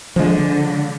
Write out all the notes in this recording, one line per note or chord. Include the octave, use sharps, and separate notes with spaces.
D3 F3 G#3